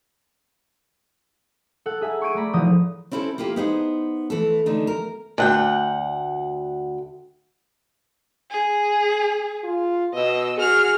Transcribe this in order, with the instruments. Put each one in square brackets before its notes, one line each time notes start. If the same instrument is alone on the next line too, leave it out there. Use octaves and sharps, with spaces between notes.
[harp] A4 F#5
G#4 E5 G#5 A#5
C#6 G6 G#6 D7 D#7
A3 D5 A#5 B5
G#1 E3 F3 D#6 A#6
[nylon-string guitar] C4 C#4 E4 G4 A4
A#3 E4 F4 G4
B3 D#4 G#4 C5
E3 A3 A4
D3 A3 D#4
A#4
[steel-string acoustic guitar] D2 F#5 G5
[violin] G#4
[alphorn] F4
[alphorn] B2 [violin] D#5 E6
[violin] F#4 F6 [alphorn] G#4